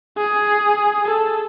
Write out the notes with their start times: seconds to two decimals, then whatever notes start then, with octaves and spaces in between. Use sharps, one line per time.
0.18 G#4
1.07 A4